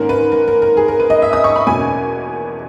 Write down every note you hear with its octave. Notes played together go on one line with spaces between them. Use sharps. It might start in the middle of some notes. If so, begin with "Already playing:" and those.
Already playing: G#2 D#3 A#3 C#4 A#4
B4
A#4
A#4
A#4
G#4
A#4
B4
D#5
E5
D#6
C#6
B5
E2 B2 A#3 C#4 G#5